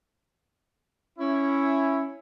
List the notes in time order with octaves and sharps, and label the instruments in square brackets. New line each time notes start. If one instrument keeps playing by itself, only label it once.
[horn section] C#4 E4